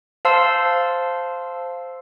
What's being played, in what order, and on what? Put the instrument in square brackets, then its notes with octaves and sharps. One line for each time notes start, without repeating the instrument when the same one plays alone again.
[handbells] C5 F5 A5 C6 E6 C7